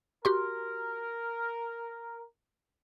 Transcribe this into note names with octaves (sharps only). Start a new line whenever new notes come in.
F#4 G4 A#4 C6